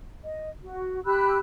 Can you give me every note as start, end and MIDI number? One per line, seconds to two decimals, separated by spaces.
0.24 0.50 75
0.63 1.01 66
1.04 1.38 67
1.04 1.38 83
1.04 1.38 88
1.04 1.38 90